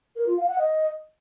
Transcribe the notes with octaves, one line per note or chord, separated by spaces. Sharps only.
A#4
F4
F5
F#5
D#5